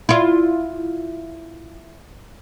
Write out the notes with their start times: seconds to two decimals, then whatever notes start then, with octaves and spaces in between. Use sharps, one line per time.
0.09 E4 F4